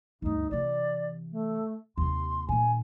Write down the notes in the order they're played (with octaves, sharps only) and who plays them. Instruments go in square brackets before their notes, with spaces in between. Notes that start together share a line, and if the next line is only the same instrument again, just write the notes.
[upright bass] D2 G2 [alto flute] D#4
[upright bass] C3 E3 [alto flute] D5
[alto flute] A3
[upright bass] D#2 C3 [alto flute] C6
[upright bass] A#2 D#3 [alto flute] G#5